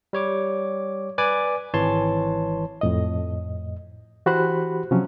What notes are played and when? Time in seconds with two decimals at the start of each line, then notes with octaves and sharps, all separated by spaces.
0.13 G3 C#5 D6
1.18 B4 D5 G#5 D6
1.74 G#1 E3 C#5 A5 C6
2.81 F2 A2 D#5
4.26 E3 F#4 G4 C5 B5 F#6
4.91 C3 F3 F#3 C#4